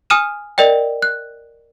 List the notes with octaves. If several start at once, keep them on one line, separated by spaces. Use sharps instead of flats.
G#5 D#6 F6 D#7 E7
A#4 D5 D#5 G5
F#6